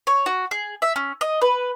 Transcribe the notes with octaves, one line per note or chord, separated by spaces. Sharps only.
C#5
F#4
G#4
E5
C#4
D#5
B4